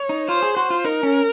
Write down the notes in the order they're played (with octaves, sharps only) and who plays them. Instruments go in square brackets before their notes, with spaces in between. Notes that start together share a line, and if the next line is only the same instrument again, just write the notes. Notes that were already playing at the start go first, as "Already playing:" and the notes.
Already playing: [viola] C#5
[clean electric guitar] D#4
[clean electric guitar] F4 [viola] C5
[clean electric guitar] G#4
[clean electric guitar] F#4 [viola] C5
[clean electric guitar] F4
[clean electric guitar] D#4 [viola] A#4
[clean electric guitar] C#4